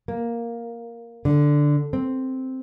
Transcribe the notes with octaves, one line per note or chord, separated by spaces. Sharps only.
A#3
D3
C4